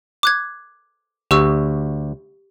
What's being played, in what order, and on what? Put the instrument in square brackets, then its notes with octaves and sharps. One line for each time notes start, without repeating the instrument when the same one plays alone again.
[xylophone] D6 F#6 G#6
[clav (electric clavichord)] D2 [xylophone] G4 C#6 E6